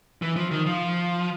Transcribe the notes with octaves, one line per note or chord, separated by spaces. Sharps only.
E3
F3
D#3
F3